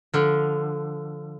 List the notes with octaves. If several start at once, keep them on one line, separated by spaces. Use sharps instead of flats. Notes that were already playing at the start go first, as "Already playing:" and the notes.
D3 F3